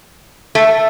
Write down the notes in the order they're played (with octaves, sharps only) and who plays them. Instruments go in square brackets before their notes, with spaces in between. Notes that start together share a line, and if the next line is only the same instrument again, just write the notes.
[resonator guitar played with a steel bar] A3